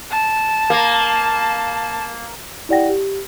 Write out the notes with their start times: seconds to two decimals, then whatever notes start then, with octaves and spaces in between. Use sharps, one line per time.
0.11 A5
0.70 A#3
2.69 E4 G4 D5 F#5 G5 A#6
2.89 G4